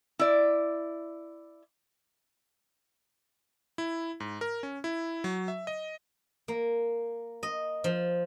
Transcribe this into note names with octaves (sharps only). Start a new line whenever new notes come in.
E4 D5
E4
G#2
A#4
C#4
E4
F#3
E5
D#5
A#3
D#5
F3